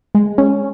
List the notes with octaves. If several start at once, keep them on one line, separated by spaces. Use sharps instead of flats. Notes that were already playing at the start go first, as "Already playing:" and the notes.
G#3
C#4